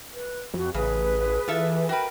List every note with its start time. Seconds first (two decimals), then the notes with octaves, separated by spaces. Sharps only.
0.14 B4
0.54 F2 F#4
0.74 A1 C#3 G#4 B4
1.48 E3 F4 A4 E5
1.89 F#4 A#4 B4 G5